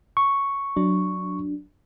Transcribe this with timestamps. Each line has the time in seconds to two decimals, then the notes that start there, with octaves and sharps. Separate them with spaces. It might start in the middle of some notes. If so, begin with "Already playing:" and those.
0.17 C#6
0.76 F#3 D4